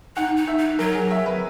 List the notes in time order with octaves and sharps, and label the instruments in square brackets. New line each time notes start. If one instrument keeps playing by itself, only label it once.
[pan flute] D#4 [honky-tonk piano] F#5
[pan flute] D#4
[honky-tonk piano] E5
[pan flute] D#4
[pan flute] F#3 [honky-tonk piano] A#4
[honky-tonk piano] G#4
E5
B4